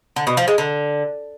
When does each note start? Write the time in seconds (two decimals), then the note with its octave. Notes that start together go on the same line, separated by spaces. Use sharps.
0.16 D3
0.27 B2
0.37 F3
0.48 G#3
0.58 D3